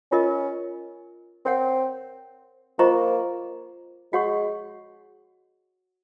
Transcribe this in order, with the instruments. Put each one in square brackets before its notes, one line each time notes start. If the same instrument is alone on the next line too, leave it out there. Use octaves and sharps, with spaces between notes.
[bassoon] C#4 [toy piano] F4 A#4 D#5
[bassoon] C4 [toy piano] A#4 C#5 F#5
[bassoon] A#3 [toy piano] F4 C5 D#5 A#5 C#6
[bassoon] G#3 [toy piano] F#4 C#5 F#5 C#6